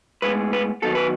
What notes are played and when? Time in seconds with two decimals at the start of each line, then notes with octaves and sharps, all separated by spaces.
0.22 A2 G#3 B3 B4
0.53 B4
0.82 D#3 F#3 B3 A4
0.95 B4